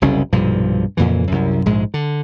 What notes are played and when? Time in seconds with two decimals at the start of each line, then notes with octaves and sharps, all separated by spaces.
0.02 F#1 C2 C#3 C#4
0.33 B1 G2 A#2 F3
0.97 F2 A#2 C#3 E3
1.27 C2 F#2
1.65 A#1 G#2 G#3
1.94 D3